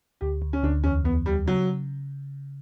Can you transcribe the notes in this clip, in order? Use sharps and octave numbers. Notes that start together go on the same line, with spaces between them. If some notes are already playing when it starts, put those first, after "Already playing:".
D2 G4
D2
C#4
D2 D4
E2 C#4
E2 B3
E2 G3
C#3 F#3